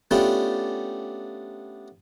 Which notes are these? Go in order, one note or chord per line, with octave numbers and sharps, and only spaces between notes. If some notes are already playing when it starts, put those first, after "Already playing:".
A3 B3 C#4 D4 F4 G4